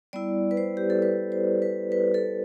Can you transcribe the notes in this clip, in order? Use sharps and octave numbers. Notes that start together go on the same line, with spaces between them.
G3 B3 E4 D5
B4
C5
G4
A4
B4
C5
B4
B4
A4